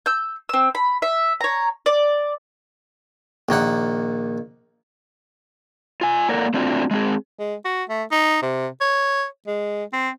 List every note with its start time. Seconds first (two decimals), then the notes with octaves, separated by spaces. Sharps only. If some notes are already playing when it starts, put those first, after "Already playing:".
0.06 E6 G6
0.49 C4 E6
0.75 B5
1.02 E5
1.41 C#5 A#5
1.86 D5
3.49 A#1 D#3 A#3 F#5
6.01 F4 G#5
6.29 A#3 A4 A#4 D5 F#5
6.54 A3 C4 D4 F4 F#4
6.91 G#3 C4 G#4
7.39 G#3
7.65 F#4
7.89 A3
8.11 D#4
8.42 C3
8.81 C#5
9.47 G#3
9.93 C4